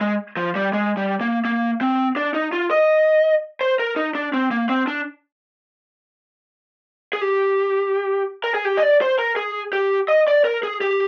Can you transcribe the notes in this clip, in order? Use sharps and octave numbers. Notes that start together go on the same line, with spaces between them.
G#3
F3
G3
G#3
G3
A#3
A#3
C4
D4
D#4
F4
D#5
C5
A#4
D#4
D4
C4
A#3
C4
D4
G#4
G4
A#4
G#4
G4
D#5
D5
C5
A#4
G#4
G4
D#5
D5
A#4
G#4
G4